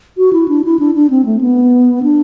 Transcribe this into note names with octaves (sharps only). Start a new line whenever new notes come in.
F#4
E4
D4
E4
D4
D4
C4
A3
B3
D4